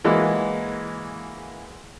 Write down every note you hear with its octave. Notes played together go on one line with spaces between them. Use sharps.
E3 G#3 A#3 F#4